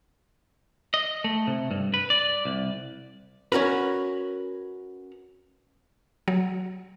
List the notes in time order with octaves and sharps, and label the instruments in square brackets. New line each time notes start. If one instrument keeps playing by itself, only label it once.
[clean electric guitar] D#5
A3
C3
G2
B4
D5
C2
[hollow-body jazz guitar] C#4 F#4 A#4 B4
[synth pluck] F#3